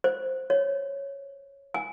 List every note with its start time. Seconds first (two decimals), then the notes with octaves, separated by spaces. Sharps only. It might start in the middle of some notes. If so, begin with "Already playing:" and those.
0.04 C5
0.50 C#5
1.74 G#5